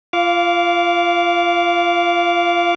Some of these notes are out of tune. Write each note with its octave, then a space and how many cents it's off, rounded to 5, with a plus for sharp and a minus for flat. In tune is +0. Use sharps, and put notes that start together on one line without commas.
F4 -25 F5 +0 D6 -25